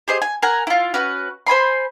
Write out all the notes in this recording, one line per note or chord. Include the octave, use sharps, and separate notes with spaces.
G4 G#4 C5 D#5
G#5
A#4 F#5 G#5 A#5
E4 F4
C#4 F#4 B4
C5 G#5 B5 C6